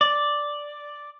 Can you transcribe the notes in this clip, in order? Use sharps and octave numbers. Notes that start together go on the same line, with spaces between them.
D5